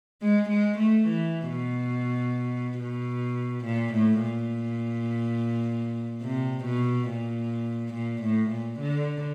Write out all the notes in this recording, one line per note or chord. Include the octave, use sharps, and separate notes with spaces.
G#3
G#3
A3
E3
B2
B2
A#2
A2
A#2
C3
B2
A#2
A#2
A2
A#2
D3